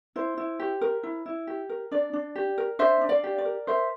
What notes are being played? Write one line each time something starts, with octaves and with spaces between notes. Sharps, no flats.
E4 C5
E4
G4
A#4
E4
E4
G4
A#4
D4 D5
D4
G4
A#4
D4 C5 E5
D4
D5 F5
G4
D5
A#4
A#4 C5 E5